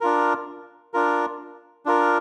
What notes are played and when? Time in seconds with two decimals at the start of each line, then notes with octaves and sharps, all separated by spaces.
0.01 D4 F4 A#4
0.94 D4 F4 A#4
1.86 D4 F4 A#4